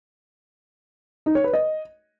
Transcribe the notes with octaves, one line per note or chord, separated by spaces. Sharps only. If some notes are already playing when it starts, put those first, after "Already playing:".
D#4
C#5
B4
D#5